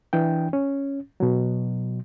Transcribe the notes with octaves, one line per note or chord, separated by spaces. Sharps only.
E3 D4 G5
C#4
B2 F#3